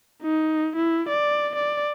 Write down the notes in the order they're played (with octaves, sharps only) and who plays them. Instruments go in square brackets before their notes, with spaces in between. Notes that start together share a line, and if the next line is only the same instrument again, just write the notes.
[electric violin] D#4
E4
D5
D5